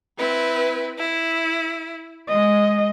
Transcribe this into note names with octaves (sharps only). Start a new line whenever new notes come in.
C4 E4 B4
E4
G#3 D#5